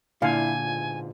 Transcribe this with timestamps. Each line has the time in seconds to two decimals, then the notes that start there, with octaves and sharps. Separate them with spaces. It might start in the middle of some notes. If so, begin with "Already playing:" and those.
0.22 A#2 D3 E4 F5 G#5
0.60 G#2 B2 F4